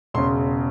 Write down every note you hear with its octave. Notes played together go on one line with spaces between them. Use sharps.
E1 C#3 C6